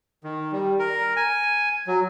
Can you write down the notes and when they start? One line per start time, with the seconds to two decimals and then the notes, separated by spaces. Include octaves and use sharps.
0.24 D#3
0.52 G3
0.79 A#4
1.16 G#5
1.87 F#3